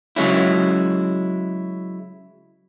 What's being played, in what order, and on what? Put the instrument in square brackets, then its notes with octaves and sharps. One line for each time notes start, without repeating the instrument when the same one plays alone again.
[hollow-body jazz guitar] C#3 F#3 G#3 C#4 E4